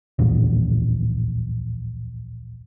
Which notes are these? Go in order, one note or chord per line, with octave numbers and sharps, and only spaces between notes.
D1 A#1 E2